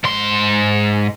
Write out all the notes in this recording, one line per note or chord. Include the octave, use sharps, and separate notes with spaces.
G#2 C6